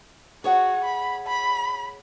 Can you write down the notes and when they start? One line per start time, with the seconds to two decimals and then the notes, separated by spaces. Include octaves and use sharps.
0.44 F#4 G#4 C#5 F#5
0.84 B5
1.27 B5